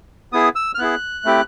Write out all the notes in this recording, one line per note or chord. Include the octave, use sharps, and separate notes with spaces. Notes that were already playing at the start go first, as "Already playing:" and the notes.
B3 E4 G#4 D#6
E6
F6
B3 E4 G#4 F#6
A3 C4 E4 G4